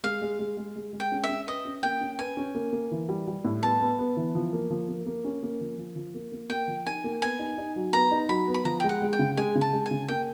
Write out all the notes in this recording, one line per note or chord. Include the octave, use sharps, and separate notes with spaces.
G#3 F5
G#3
G#3
G#3
G#3
G#3
G5
C#4
E5
C#4
B4 D#5
C#4
A#3 G5
C#4
B4 G#5
C#4
A#3
A#3
E3
G3
G3
A2
B3 A5
B3
B3
E3
F3
A#3
F3
A#3
A#3
C#4
A#3
F3
F3
F3
A#3
A#3
A#3 G5
F3
D#4 G#5
A#3
B3 G#5
D#4
D#4
F#3
B3 A#5
D#4
F#3 B5
B3
B5
F3 A#5
G5
G#3
F#5
G#3
G5
C#3
G#3 G#5
C#3
A5
G#3
G#5
C#3
A#3 G5